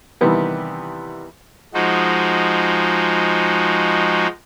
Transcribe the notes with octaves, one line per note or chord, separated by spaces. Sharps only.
C3 D#3 E3 G3 B3 G4
F3 G#3 D#4 F#4